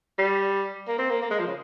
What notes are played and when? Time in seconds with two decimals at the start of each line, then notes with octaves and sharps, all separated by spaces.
0.18 G3
0.87 A#3
0.98 C4
1.10 A#3
1.22 A#3
1.31 G#3
1.39 F3
1.47 C#3